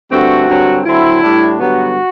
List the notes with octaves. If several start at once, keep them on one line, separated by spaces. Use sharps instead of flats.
G2 D3 A3 C4 F#4
G2 D3 F#3 C4
D3 F#3 C4 E4
A2 G3 D4
G2 D3 F#3 B3 F#4